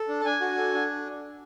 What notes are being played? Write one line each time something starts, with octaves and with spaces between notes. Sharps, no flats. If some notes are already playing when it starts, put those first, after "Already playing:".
Already playing: A4
D4
A5
D4 G#5
F#4
A4
D4